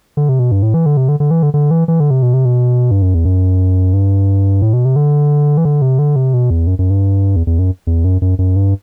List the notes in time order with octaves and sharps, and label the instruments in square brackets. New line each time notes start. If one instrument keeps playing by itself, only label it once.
[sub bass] D3
C3
B2
G2
A2
E3
D3
C3
D3
D3
E3
D3
D3
E3
E3
D3
C3
B2
C3
B2
G2
F#2
E2
F#2
G2
A2
B2
C3
D3
E3
D3
C3
D3
C3
B2
E2
F#2
F#2
G2
E2
E2
F#2
E2
F#2
F#2
F#2
G2